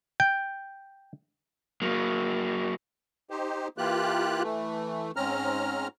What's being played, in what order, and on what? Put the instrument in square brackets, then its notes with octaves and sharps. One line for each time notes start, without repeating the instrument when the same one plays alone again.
[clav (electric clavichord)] G5
[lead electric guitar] F#3 A#3
[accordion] D#4 G4 C5
E3 A#3 F4 G4 F#6
E3 A3
G#2 C4 C#4 A#5 F6